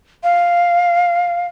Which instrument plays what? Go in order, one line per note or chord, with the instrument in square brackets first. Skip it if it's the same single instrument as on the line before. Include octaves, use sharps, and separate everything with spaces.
[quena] F5